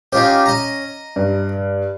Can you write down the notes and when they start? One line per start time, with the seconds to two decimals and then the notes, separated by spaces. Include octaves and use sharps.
0.13 C#4 D#4 F4 G4
0.46 D#5 A#5
1.16 G2